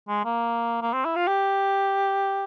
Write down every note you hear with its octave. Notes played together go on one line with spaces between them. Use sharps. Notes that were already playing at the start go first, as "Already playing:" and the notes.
G#3
A#3
A#3
C4
E4
F4
G4